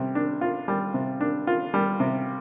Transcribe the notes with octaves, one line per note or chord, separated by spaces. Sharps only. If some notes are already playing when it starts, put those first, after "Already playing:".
Already playing: C3 G3
D4
F4
G3
C3
D4
F4
G3
C3